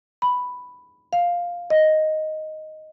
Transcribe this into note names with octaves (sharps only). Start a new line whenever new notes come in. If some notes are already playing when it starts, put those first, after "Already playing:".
B5
F5
D#5